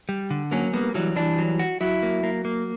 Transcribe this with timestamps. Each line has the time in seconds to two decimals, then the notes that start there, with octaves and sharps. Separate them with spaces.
0.09 G3
0.30 D3
0.51 F#3 A#3 C#4
0.73 G3 A#3 B3
0.94 E3 F#3 G3
1.16 E3 G3 D4
1.38 F#3
1.59 F#4
1.81 F#3 E4
2.03 A#3
2.23 A#3
2.45 A#3